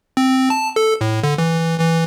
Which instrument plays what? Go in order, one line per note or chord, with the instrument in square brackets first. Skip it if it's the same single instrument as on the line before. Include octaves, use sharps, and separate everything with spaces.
[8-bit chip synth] C4
A5
A4
A2
D3
E3
E3